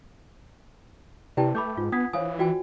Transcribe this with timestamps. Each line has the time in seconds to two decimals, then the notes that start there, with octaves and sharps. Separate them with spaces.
1.37 C3 E4 G4 B4 D5 G5 A5
1.55 A3 B5 D6 G6
1.77 G#2 F4
1.92 B3 D4 F#5 D#6 G#6 B6
2.13 E3 C5 C#5 F5 G#5 D#6
2.39 F4 F#4 D5 G5 G#5